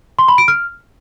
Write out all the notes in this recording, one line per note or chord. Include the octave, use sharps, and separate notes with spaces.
C6
B5
D7
F6